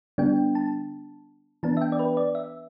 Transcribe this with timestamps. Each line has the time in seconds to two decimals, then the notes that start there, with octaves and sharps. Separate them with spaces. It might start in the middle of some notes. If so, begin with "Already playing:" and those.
0.18 D3 G3 B3 D4 G5
0.55 A5
1.63 E3 B3 D4 A5
1.77 E5
1.82 G5
1.92 D5
1.99 B4
2.17 D5
2.35 E5